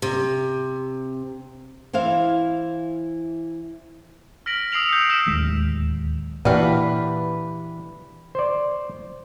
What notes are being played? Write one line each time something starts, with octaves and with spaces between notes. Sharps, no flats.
C3
E3 E4 C5 F5
F6 A#6 B6 D7 F#7
D#6 E6 C7 D7 F7 F#7
G6 C#7
E6 F6 G6 B6 D7 E7
D1 D#2 G#3
A#2 E3 D4 F#4 G4 B4 F5
C5 D5